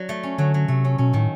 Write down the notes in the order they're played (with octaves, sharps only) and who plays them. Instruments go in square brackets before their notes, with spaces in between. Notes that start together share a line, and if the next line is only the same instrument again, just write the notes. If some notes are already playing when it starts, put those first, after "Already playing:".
Already playing: [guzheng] F#3 D4
A3
C#4
[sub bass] D3 [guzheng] F#3
[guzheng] F#3
[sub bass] C3 [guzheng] A3
[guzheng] C#4
[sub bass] B2 [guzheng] C#4
[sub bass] A2 [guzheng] D#3